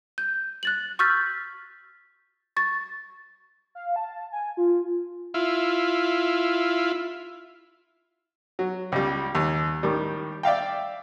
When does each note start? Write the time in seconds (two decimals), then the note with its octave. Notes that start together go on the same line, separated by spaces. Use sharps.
0.18 G6
0.63 F#6 A6 F#7
0.99 C#6 E6 F6 G6 A6 B6
2.57 C#6 A6
3.75 F5
3.96 A5
4.32 G#5
4.57 F4
5.34 E4 F4
8.59 F#3
8.92 C#2 G3
9.35 D#2
9.83 A2 D#3 G3
10.43 D5 E5 F5 G5